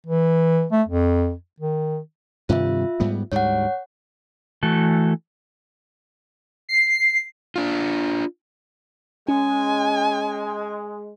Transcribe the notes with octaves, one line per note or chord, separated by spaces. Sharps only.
E3
A3
F2
D#3
G2 C3 D#3 F4 E5
G#2 G3 B3
D2 G#2 G3 C#5 F#5
E3 A3 F#4 A4
C7
D4 F4
G#3 C#4 G#5